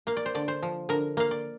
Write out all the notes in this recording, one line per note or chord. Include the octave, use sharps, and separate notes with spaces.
A#3 F5
D5
C5
D3 D5
C5
F3
D3 A#4
A#3 F5
D5